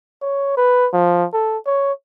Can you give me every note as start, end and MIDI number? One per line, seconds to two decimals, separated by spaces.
0.22 0.57 73
0.57 0.88 71
0.93 1.26 53
1.33 1.58 69
1.67 1.93 73